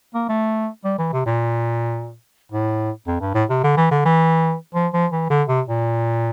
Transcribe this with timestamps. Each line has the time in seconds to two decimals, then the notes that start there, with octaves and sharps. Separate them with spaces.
0.15 A#3
0.29 A3
0.85 G3
0.99 E3
1.13 C3
1.26 A#2
2.52 A2
3.07 F2
3.21 G2
3.35 A2
3.50 C3
3.64 D3
3.77 E3
3.91 D3
4.05 E3
4.75 F3
4.93 F3
5.12 E3
5.30 D3
5.48 C3
5.68 A#2